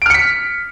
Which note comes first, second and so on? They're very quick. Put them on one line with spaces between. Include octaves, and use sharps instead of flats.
D7 F6 C#7 B6